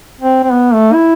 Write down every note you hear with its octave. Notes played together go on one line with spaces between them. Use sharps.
C4
C4
B3
A3
E4